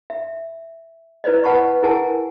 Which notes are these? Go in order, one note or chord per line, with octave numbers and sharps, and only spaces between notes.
E5
E4 B4 C5 D5 D#5
B4 F#5 A5 B5 C#6
E4 G#4 A#4 F#5 G#5 A5